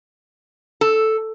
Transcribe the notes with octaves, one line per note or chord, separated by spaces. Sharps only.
A4